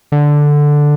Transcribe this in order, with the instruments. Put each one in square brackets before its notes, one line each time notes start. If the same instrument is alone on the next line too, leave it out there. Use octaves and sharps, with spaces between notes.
[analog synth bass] D3